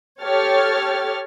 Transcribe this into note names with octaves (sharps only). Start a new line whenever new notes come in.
G4 A4 C#5 F6 A6